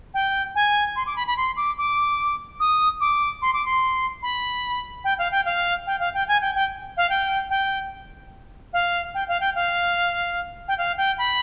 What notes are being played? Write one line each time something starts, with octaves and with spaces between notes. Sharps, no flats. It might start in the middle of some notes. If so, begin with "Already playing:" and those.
G5
G#5
C6
D6
B5
B5
C6
D6
D6
D#6
D6
C6
D6
C6
B5
G5
F5
G5
F5
G5
F5
G5
G#5
G5
G5
F5
G5
G5
F5
G5
F5
G5
F5
G5
F5
G5
B5